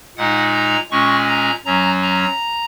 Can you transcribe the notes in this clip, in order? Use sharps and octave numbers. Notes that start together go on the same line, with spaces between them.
A#2 G#3 D#4 F#5
A#5
A#2 G#3 C#4 C#6
A#5
F#2 F#3 C#4 A#5
A#5